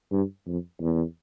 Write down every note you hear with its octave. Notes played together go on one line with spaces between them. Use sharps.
G2
F2
E2